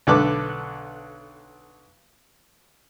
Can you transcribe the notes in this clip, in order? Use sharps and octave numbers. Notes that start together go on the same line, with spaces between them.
B1 D3 A4 B4 D6